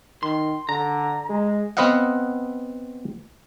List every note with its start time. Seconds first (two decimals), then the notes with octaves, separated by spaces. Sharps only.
0.23 D#3 C6
0.69 D3 A#5
1.29 G#3
1.77 B3 C4 B4 D#5 F5 F#5